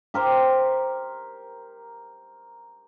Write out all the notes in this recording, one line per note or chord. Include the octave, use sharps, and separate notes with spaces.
G4 A#4 C5